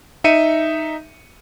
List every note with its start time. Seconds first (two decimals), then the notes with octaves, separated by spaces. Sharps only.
0.24 D#4 E5 C#7 D#7